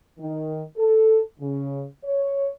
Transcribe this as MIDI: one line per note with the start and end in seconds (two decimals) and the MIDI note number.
0.19 0.62 51
0.77 1.18 69
1.39 1.83 49
2.03 2.50 73